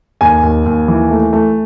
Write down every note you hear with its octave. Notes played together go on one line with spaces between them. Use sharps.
D#2 G#5
D#2
D#2
E3
A3
A3